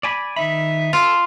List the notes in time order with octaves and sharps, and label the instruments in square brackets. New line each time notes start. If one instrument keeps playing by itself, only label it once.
[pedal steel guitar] D5 G#5 B5
[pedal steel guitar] D#3 D#4 B5 [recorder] E5
[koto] F4 [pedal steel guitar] A4